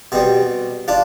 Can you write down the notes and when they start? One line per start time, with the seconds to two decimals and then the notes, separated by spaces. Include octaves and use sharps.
0.12 B2 G3 C4
0.88 D4 F4